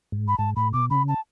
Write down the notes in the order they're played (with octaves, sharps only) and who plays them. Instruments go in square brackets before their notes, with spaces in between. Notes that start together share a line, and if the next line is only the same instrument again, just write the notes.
[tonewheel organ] G#2
[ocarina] B5
[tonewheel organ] G#2 [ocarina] A5
[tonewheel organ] A2 [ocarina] B5
[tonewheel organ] B2 [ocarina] D6
[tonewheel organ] C#3 [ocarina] B5
[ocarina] A5